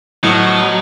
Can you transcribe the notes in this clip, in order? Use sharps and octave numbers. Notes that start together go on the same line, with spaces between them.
A2 F3 F#3 B3 D#5